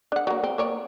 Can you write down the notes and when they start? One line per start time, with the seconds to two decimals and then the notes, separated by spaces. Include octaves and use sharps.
0.12 D4 F#5
0.27 F#3 A#3
0.44 C4
0.58 A#3 C#5 D5